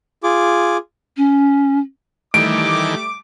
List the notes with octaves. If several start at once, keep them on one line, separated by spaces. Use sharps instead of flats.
F4 G#4 D6
C#4
D#3 E3 G3 A3 D6 D7